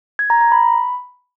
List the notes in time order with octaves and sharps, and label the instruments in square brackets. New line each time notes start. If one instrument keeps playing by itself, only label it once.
[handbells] G#6
A#5
A#5
B5